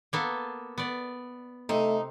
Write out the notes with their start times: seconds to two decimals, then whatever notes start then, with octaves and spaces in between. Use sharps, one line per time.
0.13 A#3 B3 A4
0.78 B3 D5
1.69 C3 A3 D#4